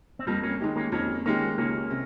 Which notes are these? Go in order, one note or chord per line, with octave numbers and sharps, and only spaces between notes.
C4
F2 G3 A#3
A#3 C#4
D#3 G#3 D#4 G4
A#3 C#4
F2 A#3 C#4
D#3 G#3 A#3 C#4 D#4 G4
C#2 A#3 C#4
C3